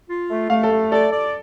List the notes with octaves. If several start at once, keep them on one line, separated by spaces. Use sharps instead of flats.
F4
A3
A3 F5
A4
A3
A4 D5
D5